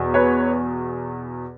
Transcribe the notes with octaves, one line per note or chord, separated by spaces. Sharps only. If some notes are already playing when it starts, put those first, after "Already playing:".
Already playing: E2 B2
B4 C#5